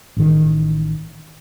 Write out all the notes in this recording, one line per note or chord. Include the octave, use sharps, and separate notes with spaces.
A1 D#3